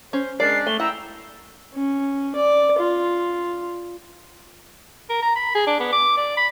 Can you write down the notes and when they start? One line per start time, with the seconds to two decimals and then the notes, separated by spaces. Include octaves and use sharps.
0.13 C#4 C5
0.40 G#3 C#4 D4 A#4 D5 C7
0.67 A3 G#5 G7
0.80 E4 F#5 G5 A#5 E6
1.74 C#4
2.35 D5
2.79 F4
5.09 A#4
5.22 A#5
5.36 B5
5.55 G#4
5.67 D4
5.80 B3
5.93 D6
6.17 D5
6.37 B5